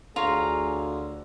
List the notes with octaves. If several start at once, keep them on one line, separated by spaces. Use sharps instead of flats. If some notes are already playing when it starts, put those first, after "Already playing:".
D2 D3 F4 G#4 C#5 A#5